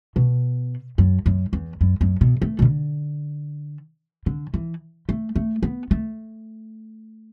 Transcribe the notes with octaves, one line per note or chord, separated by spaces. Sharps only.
B2
F#2
F#2
E2
F#2
F#2
B2
A3
B2
D3
D3
E3
A3
A3
B3
A3